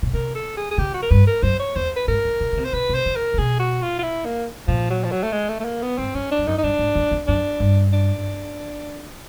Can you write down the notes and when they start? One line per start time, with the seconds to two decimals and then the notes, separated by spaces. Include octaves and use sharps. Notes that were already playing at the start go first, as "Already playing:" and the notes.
0.03 B2
0.13 C3 A#4
0.35 A4
0.57 G#4
0.71 G#4
0.78 C#3 G4
0.94 F#4
1.02 A#4
1.11 G2 B4
1.27 A#4
1.43 F#2 C5
1.59 C#5
1.75 E2 C5
1.96 B4
2.08 G#2 A#4
2.25 A2
2.40 A#2
2.52 C#3
2.57 C3
2.65 C5
2.73 B2 B4
2.89 C3
2.94 C5
3.06 D3
3.16 A#4
3.34 C3
3.38 B2 G#4
3.59 F#4
3.82 F4
3.99 F4
4.03 E4
4.25 A#3
4.67 A#2 F3
4.90 F#3
5.04 F3
5.11 F#3
5.23 A3
5.32 G#3
5.49 A3
5.60 A3
5.65 A#3
5.82 B3
5.98 G#2 C4
6.14 G2 C#4
6.31 D4
6.38 G2
6.47 F#2 D#4
6.58 D#4
6.63 G2 D4
6.79 G#2
6.95 F#2
7.11 F2
7.27 F#2 D4
7.60 G2
7.93 D4